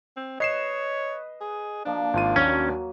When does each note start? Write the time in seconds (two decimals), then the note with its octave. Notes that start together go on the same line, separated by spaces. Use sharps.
0.17 C4
0.40 B4 C#5 D#5 C7 E7
1.41 G#4
1.86 F3 A#3 D4
2.14 G#1 F4 D#7
2.36 D#2 F#3 C#4